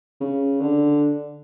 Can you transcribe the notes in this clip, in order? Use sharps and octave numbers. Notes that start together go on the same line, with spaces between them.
C#3
D3